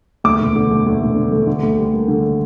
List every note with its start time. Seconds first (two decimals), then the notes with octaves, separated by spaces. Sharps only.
0.24 D2 D6
0.40 E1
0.56 D3
0.71 A3
0.86 D2
1.01 E1
1.17 D3
1.32 A3
1.47 D3
1.63 D2
1.78 G3
1.93 A#3
2.08 D3